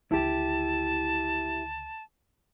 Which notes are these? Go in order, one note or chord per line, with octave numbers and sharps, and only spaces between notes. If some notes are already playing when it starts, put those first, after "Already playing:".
C#2 D3 E4 G4 A5